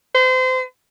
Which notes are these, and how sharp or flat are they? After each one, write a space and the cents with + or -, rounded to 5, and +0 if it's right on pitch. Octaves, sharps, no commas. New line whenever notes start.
C5 -30